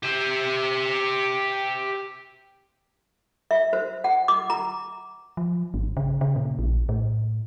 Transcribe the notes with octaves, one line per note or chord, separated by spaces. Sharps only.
G4 E5
E5
C5
F#5
D6
A#5
F3
G#1
C#3
C#3
A#2
A#1
A2